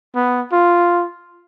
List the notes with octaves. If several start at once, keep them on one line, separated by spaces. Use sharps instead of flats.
B3
F4